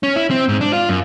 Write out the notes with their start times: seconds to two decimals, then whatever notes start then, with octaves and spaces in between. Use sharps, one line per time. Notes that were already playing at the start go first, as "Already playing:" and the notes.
0.03 C#4
0.16 E4
0.31 C4
0.49 G#2
0.61 D4
0.73 F4
0.89 F#2